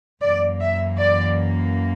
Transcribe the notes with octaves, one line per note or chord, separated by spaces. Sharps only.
F#2 E3 A#3 D5
E5
D5